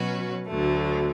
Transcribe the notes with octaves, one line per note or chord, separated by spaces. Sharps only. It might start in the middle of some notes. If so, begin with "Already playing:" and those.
Already playing: B2 F#3 C#4 F#4 B4
D2 D3 F#3 A3